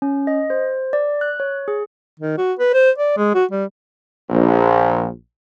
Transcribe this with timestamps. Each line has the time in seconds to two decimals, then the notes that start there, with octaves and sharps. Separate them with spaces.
0.02 C#4
0.27 D#5
0.50 C5
0.93 D5
1.21 F#6
1.40 C#5
1.68 G#4
2.20 D#3
2.38 F#4
2.59 B4
2.74 C5
2.98 D5
3.17 G#3
3.35 F#4
3.51 G3
4.31 A#1